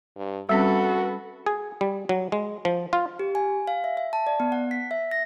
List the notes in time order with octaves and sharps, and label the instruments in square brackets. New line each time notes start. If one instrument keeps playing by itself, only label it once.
[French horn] G2
[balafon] G3 C4 C#4 [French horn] F#4 [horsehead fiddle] A4 B4
[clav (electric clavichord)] G#4
G3
F#3
G#3
F3
F4
[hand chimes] G4
G#5
F5
E5
E5
A5
D5
B3
F#5
B6
E5
A#6